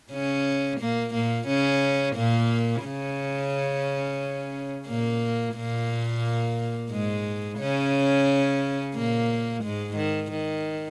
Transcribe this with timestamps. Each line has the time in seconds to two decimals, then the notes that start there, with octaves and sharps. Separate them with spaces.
0.11 C#3 C#4
0.80 A#2 A#3
1.14 A#2 A#3
1.47 C#3 C#4
2.15 A#2 A#3
2.84 C#3 C#4
4.87 A#2 A#3
5.55 A#2 A#3
6.91 G#2 G#3
7.59 C#3 C#4
8.95 A#2 A#3
9.63 G#2 G#3
9.97 D#3
10.31 D#3